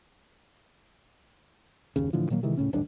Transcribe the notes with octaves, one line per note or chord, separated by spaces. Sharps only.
F#1 D#2 C#3
A2 D3 E3 F3
A#2 D#3 F#3 A#3
C3 D#3 E3 G#3
D1 A2 C#3 C#4
D1 A1 G2 D4